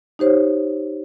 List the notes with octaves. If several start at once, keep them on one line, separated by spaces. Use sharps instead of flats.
D#4 G4 C5 C#5